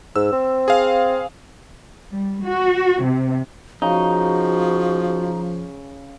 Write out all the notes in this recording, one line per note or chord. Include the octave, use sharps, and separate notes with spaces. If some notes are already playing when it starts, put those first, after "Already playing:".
G#2 E6
C4
G#4 F5
G3
F#4
C3
C#3 F3 D#4 F#4